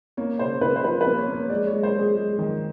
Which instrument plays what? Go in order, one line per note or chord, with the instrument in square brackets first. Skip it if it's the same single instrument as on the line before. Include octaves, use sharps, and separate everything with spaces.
[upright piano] A#3 C#5
C#3 C5
C#3 B4
C5
F3 B4
B4
A#3
C#5
A#3 C#5
G#3 D5
C#5
G#3
C5
G#3 G#4
G#3
D#3